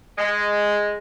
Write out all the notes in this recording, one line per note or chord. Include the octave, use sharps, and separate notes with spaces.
G#3